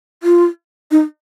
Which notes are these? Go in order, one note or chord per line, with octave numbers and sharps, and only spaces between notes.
F4
D#4